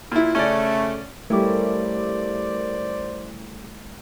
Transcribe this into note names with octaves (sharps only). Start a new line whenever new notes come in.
A#2 E4
C#3 A3 C#4 D5
G3 A3 C#4 E4 A#4 C5 D5 D6